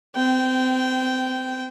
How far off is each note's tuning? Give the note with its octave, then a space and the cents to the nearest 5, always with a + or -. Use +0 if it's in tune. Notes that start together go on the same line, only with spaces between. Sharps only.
C4 -30 G5 -10